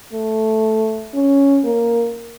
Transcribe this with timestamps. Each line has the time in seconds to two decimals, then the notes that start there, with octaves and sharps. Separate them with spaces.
0.13 A3
1.14 C#4
1.64 A#3